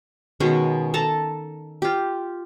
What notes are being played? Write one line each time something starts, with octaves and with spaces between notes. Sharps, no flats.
B2 D#3 G#3 C#4
A4 A5 A#5
F4 G4